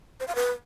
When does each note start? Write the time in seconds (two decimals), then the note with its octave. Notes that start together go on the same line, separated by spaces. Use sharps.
0.20 C5
0.28 F5
0.35 B4